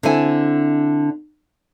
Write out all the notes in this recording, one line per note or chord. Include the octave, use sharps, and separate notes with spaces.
D3 C4 D4 E4 G#5